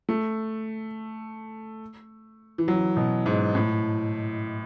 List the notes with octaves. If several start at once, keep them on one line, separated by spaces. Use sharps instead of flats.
A3
E3
F#3
B2
G#2
A2